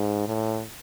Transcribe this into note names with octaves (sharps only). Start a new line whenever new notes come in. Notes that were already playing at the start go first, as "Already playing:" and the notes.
Already playing: G#2
A2